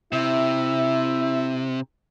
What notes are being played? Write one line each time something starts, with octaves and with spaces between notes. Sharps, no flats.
C3 E4 E5